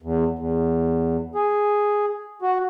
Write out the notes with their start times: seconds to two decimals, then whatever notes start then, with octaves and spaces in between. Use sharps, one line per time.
0.02 E2
0.39 E2
1.35 G#4
2.42 F#4